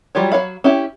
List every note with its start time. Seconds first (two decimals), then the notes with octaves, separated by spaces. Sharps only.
0.15 F#3 G3 F4 G4 C#5
0.32 F#3 A4 C#5 F5 B5
0.64 C#4 E4 G4